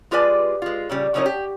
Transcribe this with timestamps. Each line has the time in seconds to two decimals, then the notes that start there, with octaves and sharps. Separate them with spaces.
0.11 G#3 F4 G4 B4 D5 G#5
0.62 G#3 F4
0.90 A#2 C#3 G3
1.14 C#3 F3 F#3 C#4 D#4 A#4
1.26 G4